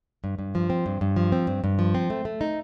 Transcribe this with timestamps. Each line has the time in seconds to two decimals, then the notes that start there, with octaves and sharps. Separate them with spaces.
0.24 G2
0.39 G2
0.55 F3
0.70 C4
0.86 G2
1.01 G2
1.17 F3
1.32 C4
1.47 G2
1.64 G2
1.79 F3
1.94 C4
2.10 A3
2.25 A3
2.41 D#4